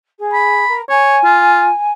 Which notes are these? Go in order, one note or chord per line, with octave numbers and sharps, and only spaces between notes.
G#4
B5
A#4
C#5 G#5
F4